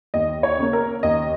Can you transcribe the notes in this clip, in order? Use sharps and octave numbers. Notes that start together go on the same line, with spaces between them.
D#2 D#5
C#5
C#3 A#3
A#4
D#2 D#5